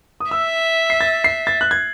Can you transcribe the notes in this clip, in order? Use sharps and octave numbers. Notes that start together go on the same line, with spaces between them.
D#6
E5 E6
C7
A6
C7
A6
F#6
G#6